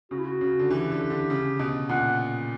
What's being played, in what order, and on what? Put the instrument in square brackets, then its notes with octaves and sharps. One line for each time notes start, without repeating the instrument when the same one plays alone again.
[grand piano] C#3 [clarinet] F#4
[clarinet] E4
F#4
[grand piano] C#3
D3
[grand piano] E3 [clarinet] G4
[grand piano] D3
D3
C#3
B2
[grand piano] A#2 [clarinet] F#5